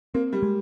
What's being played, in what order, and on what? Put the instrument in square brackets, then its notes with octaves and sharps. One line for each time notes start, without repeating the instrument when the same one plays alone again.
[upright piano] A#3 [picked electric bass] C4
[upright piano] G3
[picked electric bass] G#3